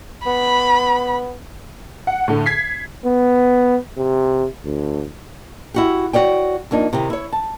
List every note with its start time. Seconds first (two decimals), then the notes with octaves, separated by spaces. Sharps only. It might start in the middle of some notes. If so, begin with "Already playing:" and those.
0.26 B3 B5
2.07 F#5
2.28 A2 D3
2.46 G#6 B6 C7
3.05 B3
3.98 C3
4.65 D2
5.74 E4 F#4 G4
6.13 F#4 C#5 D5 G5
6.71 F2 A#3 D4 D#4
6.93 C3 D#3 E4 G4
7.10 E4 C#5
7.32 A5